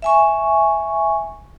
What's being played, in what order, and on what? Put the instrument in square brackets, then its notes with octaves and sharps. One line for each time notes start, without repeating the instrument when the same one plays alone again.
[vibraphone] E5 G#5 C#6